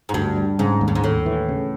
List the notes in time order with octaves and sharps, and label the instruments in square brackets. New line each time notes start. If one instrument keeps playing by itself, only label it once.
[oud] G#2
[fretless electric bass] D2 [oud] G2
[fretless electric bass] G3
[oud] G#2 [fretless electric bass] C#3
[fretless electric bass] D#2
[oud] G2
G#2
[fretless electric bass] D#2 [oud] A2
[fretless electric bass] E3
C#3